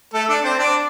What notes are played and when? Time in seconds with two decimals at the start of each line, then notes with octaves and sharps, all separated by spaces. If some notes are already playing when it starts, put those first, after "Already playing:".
0.14 A3 A4
0.29 D4 D5
0.44 C4 C5
0.59 D4 D5